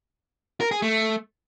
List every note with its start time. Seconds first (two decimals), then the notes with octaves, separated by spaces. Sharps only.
0.60 A#4
0.71 G#4
0.82 A3